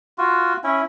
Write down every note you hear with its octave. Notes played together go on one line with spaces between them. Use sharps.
F4 F#4
C#4 E4